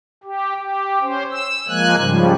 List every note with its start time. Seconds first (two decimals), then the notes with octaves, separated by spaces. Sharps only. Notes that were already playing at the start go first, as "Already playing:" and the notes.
0.24 G4
0.59 G4
1.01 C#4 C5
1.31 E6
1.68 F3 G#3 A#3 G#5 F#6
1.96 G#2 C#3 F3 G3